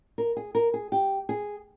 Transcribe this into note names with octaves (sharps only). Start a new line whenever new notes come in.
A#4
G#4
A#4
G#4
G4
G#4